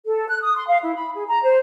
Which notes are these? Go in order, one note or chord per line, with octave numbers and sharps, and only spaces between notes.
A4
F#6
D#6
C6
F5
E4
B5
G#4
A#5
C5